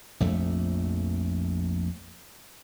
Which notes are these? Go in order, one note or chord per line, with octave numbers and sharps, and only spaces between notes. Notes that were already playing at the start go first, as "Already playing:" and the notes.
A#1 F2 A3